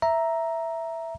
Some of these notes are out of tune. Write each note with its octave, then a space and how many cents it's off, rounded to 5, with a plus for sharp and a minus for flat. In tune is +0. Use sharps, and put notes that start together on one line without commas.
E5 +0 A#5 +0